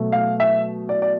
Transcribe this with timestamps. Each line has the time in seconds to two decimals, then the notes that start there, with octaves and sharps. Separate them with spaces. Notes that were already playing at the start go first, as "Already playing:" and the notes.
Already playing: B2 F#3 A3
0.12 F5
0.40 E5
0.89 D5
1.02 D5